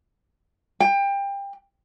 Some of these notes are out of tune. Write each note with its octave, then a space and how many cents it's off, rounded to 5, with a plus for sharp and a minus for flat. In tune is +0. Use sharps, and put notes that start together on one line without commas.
G5 +25